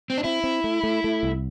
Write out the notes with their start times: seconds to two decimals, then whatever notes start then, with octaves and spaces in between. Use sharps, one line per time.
0.10 C4
0.18 D4
0.24 C4 E4
0.44 C4
0.64 A3
0.83 A3
1.04 A3
1.23 C2